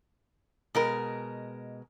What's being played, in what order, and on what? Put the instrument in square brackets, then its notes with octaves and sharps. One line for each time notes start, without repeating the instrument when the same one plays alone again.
[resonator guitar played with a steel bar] B2 G#3 A#4